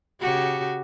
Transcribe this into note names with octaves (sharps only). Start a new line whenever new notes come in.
C#3 F#4 G4